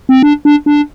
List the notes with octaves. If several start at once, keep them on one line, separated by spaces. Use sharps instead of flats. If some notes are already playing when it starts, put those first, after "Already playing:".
C4
D4
D4
D4